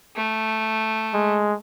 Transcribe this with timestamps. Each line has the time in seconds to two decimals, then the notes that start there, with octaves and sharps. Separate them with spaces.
0.16 A3
1.14 G#3